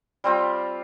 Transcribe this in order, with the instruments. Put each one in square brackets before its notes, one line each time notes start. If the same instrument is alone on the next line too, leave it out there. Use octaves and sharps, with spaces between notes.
[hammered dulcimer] G3 C4 F4 G4